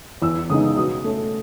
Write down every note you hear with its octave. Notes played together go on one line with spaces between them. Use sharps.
E2 E6
C#3 G#3 B3 D#4 D#6
B2 D#6
A3 C#4